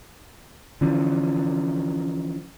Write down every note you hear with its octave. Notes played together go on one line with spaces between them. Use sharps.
D3 E3 F3 C#4